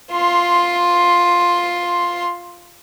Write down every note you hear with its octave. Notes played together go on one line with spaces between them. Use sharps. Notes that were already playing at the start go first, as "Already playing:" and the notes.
F4 C6